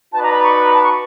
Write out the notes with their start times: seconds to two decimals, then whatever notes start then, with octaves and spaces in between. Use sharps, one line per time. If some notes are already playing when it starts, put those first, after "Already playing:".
0.12 D#4 F#4 B4 D5 A5
0.23 A#5
0.32 B5
0.43 C#6
0.63 A#5
0.73 A5
0.83 C#6